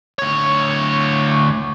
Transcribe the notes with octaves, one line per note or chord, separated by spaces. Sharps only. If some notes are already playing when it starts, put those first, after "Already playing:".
D2 C#5